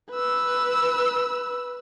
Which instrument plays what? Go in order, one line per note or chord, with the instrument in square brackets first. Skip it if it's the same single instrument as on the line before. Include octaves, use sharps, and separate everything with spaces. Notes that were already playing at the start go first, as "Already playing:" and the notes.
[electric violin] B4 E6